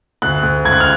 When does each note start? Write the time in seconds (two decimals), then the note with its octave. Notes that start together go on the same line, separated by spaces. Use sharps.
0.22 D2 F#6
0.43 D2
0.65 C#2 G#6
0.72 F#6
0.80 F6